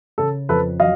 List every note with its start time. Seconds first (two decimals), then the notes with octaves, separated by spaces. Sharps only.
0.18 C#3 A4
0.49 F2 A4 B4
0.80 F#3 D#5 F5